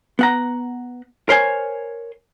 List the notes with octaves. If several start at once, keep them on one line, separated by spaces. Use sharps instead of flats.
B3 F#5 A#5
A#4 C5 C#5 G#5